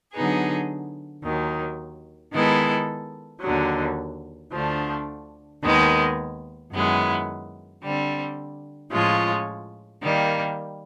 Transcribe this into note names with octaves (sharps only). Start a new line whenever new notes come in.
D3 F#3 B3 D#4 G#4
D#2 D#3 F#3
D#3 G#3 B3 E4 A4
D#2 D3 F#3
D2 D3 F3 A3 D4
D#2 D#3 G#3 B3
F#2 D#3 G#3 B3 E4
D3 G3 C4
A2 F3 G#3 C#4 F4
D#3 G3 A#3